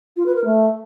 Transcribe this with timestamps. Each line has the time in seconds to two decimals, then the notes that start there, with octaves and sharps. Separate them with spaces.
0.16 F4
0.26 B4
0.35 A#4
0.45 A3